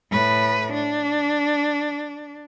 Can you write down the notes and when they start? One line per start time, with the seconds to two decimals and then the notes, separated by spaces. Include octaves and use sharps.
0.11 A2 B4
0.74 D4